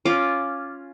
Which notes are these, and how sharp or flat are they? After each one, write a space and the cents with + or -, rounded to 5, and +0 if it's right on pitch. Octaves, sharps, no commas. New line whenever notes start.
C#4 +0 F4 +0 D6 +0